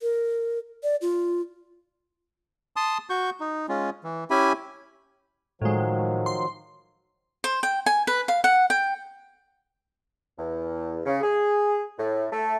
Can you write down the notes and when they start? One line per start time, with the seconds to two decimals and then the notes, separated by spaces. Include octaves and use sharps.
0.02 A#4
0.83 D5
1.01 F4
2.76 A5 C6 D#6
3.10 F#4 C#6 G6
3.40 D#4
3.68 G#3 C#4 F4
4.04 E3
4.30 C#4 E4 G4 E5 G#5 B5
5.62 A2 D#3 F3 F#3 G#3
6.26 C6
7.44 C5
7.63 G5
7.86 G#5
8.07 B4
8.28 F5
8.44 F#5
8.70 G5
10.38 E2
11.06 C#3
11.22 G#4
11.98 A2
12.32 A3